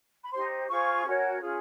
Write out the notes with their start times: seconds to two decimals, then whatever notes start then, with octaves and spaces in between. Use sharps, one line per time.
0.24 B5
0.32 D#4 G4 C5 C6
0.69 F4 G#4 C5 C#6
1.05 C#4 F#4 A#4 C#5
1.41 C#4 F4 G#4